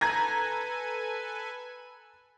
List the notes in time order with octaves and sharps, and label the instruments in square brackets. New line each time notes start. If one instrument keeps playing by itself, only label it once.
[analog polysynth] A4 B4 G#5 [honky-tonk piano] A#5 G#6 A#6